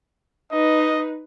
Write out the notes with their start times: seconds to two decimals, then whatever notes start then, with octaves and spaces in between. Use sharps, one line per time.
0.52 D#4 B4 D#5